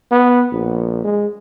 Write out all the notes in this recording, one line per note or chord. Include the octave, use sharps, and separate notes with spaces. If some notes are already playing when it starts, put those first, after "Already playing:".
B3
A#1
G#3